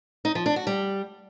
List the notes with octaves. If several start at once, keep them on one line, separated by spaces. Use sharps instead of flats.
D#4
F3
D4
F#4
G3